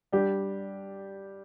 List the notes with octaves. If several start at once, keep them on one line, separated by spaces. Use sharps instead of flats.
G3 D4 G4